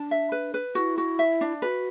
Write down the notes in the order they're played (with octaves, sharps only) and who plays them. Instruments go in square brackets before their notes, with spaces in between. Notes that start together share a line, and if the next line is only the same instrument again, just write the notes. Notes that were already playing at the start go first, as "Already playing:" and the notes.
Already playing: [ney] D4 [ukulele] A5
[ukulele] E5
B4
B4
[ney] E4 [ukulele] F#4
[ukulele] F#4
E5
D4
[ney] F#4 [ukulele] B4